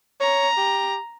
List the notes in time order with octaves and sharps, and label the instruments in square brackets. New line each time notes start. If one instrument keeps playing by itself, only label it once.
[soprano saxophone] C#5 [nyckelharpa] A#5
[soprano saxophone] G4